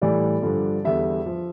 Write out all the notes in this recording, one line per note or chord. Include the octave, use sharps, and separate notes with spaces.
A2 E3 G3 D5
G2 D3 F3
E2 D3 G3 E5
F3